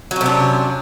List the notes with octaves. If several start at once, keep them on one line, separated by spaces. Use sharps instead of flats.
C3 F#3 C#4 D4